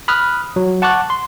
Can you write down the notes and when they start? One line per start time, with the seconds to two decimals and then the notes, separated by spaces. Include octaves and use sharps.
0.08 B5 D#6 F6 F#6
0.56 F#3
0.82 F#5 A5 C#6 D6 F#6
1.10 C6